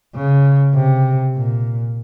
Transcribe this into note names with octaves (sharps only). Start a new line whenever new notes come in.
C#3
C3
A#2